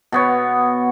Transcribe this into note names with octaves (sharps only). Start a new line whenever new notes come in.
B2 B3 C#5